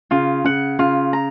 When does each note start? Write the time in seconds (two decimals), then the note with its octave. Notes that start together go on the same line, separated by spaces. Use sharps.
0.11 C#3 F4
0.44 C#3 F#5
0.79 C#3 F4
1.13 A#5